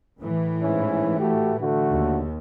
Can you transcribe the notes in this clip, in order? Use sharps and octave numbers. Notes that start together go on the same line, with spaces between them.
A2 E3
G#2 C#4 E4
A3 F#4 G4
D3 A3 F#4
D#2